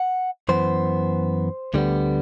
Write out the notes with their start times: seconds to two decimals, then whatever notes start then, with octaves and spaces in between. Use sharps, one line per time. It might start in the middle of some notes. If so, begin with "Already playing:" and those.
Already playing: F#5
0.49 F#2 E3 B3 C5
1.74 D2 D3 G3 B3